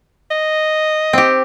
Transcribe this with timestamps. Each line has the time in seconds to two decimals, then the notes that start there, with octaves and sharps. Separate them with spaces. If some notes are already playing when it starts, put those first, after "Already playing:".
0.31 D#5
1.13 C4 G4